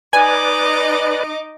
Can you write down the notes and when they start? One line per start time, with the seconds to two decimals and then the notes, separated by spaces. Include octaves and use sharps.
0.13 D#4 B4 D5 D#5 G#5 D6